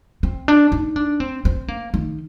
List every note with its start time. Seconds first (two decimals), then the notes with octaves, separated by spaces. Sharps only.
0.23 C4
0.48 D4
0.72 D#4
0.96 D4
1.20 C4
1.45 C4
1.68 A#3
1.94 D#3